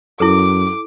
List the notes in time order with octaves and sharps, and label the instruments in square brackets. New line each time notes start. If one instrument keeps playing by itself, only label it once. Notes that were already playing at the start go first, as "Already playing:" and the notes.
[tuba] F#2 [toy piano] E4 A4 [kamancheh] D6